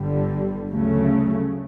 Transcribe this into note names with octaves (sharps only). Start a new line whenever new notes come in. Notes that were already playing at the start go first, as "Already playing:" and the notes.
Already playing: G1 G2 D3 G3
D2 C#3 F#3 A3